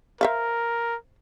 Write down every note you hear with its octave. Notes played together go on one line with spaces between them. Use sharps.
A#4 C5 E5 F5